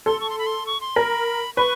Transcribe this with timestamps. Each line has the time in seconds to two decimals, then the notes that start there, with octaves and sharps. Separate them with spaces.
0.06 A4 C6
0.21 C#6
0.30 C6
0.39 B5
0.46 C6
0.67 C#6
0.81 C6
0.96 A#4 B5
1.56 B4 C#6